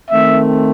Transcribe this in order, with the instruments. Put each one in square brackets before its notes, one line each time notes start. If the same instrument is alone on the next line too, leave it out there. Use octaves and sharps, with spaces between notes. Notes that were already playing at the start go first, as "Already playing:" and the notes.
[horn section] D#3 A3 C4 E5